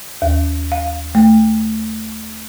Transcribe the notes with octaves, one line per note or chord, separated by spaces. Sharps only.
D#2
F5
A3